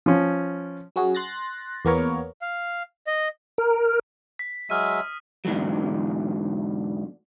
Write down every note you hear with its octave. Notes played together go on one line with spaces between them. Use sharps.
F3 C#4
F#3 C#4 F#4 G#4
C6 F#6 A6 A#6
E2 A#3 B3 A#4 C#5
F5
D#5
A#4
B6
F#3 G#3 E5 D#6 F6 D#7
E2 G#2 D3 E3 F#3